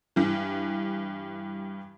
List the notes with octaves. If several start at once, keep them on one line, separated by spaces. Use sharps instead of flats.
G2 E3